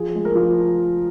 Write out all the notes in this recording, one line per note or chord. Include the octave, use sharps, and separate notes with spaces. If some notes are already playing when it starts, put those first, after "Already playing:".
Already playing: F3 G#4
G#3
A#4
F3